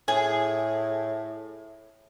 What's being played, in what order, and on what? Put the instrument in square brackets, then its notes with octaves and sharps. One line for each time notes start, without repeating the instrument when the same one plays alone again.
[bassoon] A2 [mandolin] G#4